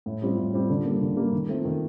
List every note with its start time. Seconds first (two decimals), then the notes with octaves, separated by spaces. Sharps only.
0.06 A2
0.22 G3 C4 F4
0.37 A2
0.54 G3 C4 F4
0.70 D3
0.85 G3 A#3
1.01 D3
1.17 G3 A#3
1.33 D#3
1.49 A3 C4 F4
1.65 D#3